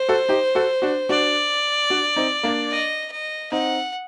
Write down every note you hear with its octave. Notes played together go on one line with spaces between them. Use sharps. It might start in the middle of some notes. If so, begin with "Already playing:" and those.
Already playing: C5
F#4 A4
D#4 G4
F#4 A4
D4 F#4
D4 F#4 D5
D4 F#4
C4 D#4
A#3 D4
D#5
D#5
C4 D#4 F#5